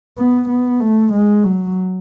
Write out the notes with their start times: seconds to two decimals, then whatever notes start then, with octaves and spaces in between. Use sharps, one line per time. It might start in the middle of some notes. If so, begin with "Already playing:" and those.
0.18 B3
0.48 B3
0.80 A3
1.13 G#3
1.44 F#3